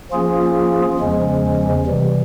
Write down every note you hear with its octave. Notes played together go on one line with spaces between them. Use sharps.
F3 A#3 C#4 F4 G#4
E2 C#3 F3 G#3 C#4
C3 E3 G3